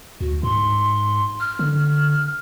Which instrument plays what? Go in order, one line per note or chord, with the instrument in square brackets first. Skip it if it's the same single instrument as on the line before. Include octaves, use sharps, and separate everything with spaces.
[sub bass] D2 [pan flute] F#4
[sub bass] G#2 [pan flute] C6
[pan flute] F6
[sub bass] D3